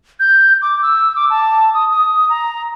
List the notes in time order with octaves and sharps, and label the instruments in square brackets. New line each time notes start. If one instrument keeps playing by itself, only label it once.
[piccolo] G6
D6
E6
D6
A5
D#6
D#6
A#5